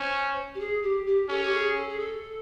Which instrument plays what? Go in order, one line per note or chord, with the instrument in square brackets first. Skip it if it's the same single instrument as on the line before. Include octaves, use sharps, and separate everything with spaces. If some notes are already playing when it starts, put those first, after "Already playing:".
Already playing: [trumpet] C#4 [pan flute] C5
[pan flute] G4
G#4
G4
G4
[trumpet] C#4 [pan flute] A4
[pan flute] G4
G#4
A4
G#4
A4